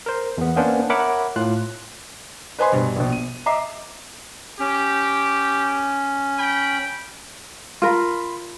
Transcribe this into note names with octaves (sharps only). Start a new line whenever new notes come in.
A#4 C5
E2 B3
A#3 B3 C#4 D4 C5
A#4 C#5 E5 F#5 B5 D6
A2 F4 F#6
B4 C5 D#5 G#5 B5 C6
G2 B2
A#1 B2
D#7
D#5 E5 A#5 D6 C7
C#4 G4
G5 B5
F4 A#4 B5 C6